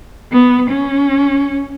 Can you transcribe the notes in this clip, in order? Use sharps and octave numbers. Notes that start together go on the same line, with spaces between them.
B3
C#4